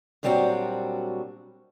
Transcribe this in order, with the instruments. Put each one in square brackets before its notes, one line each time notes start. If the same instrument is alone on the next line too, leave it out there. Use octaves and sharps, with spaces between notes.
[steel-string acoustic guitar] A#2 F#3 G3 C4 D4 F#4